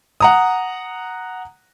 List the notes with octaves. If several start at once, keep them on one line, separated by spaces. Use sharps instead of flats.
F#5 A#5 D#6